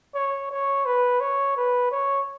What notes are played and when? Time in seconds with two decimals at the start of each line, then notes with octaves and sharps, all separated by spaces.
0.14 C#5
0.51 C#5
0.85 B4
1.20 C#5
1.56 B4
1.91 C#5